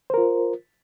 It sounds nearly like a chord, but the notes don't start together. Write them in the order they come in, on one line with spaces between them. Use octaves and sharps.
C5 A#4 F4